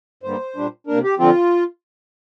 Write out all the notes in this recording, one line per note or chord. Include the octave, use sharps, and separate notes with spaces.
G2 D3 G3 A#3 C5
A#2 G3 D4
C3 A#3 D4 A#4
G4
D3 F3 C4 F4